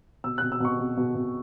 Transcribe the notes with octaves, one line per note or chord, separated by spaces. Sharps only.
B2 E6
B2 F#6
E6
B2 C#6
B2
B2
B2